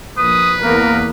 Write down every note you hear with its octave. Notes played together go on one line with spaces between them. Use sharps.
A#1 B4 D#6
E2 A#3 B3 A#4